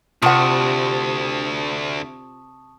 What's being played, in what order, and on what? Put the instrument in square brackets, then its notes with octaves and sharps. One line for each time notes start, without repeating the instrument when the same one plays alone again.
[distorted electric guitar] D2 [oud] C3 [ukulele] F4 F#5 [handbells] A5 C#6 D#6